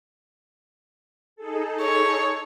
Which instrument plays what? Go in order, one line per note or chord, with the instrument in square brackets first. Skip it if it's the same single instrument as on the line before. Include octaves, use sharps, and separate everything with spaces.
[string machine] D#4 G#4 A4
[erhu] C#5